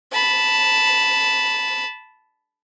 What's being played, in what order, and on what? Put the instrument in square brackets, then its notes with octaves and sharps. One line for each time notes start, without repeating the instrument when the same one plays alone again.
[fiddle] A5 B5